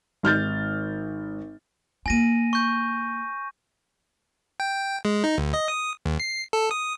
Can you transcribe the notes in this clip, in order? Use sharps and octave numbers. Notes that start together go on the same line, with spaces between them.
G#1 F6 G6 A6
A#3 F4 G#5 A#6 D#7
C#6 G6
G5
G#3
D#4
D2
D#5
D#6
D#2
C7
A4
D#6